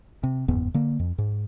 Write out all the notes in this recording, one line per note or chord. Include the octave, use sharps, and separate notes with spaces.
C3
F#1 E2 G#2 B3
D3 A#3
F2
G#2